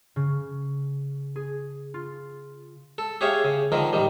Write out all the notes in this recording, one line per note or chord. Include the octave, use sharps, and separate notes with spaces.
C#3
G#4
F4
A4
G4 G#4 C#5 E5 F5
C#3
D3 D#3 F3 A#4
A1 D#3 G3